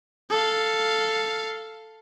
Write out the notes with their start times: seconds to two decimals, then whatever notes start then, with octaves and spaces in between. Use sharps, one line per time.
0.30 A4 F5